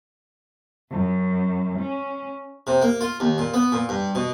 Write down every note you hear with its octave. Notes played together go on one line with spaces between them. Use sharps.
F#2
C#4
C3
A#3
F4
D#2
A#2
B3
A#2
G2
B2